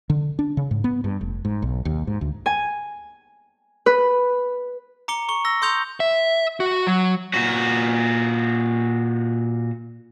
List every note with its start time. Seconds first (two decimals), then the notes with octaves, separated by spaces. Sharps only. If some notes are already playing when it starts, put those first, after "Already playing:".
0.10 D3
0.39 D4
0.57 C#3
0.71 G#2
0.84 B3
1.04 G2
1.21 F1
1.45 G#2
1.62 B1
1.85 D#2
2.07 G#2
2.21 D2
2.46 G#5
3.86 B4
5.08 A#5 D6 C#7 G7
5.29 C#6 C#7 G7
5.45 E6 A#6 G7
5.62 C6 D#6 G6 C#7 F7
6.00 E5
6.60 F#4
6.87 F#3
7.34 A#2 F#4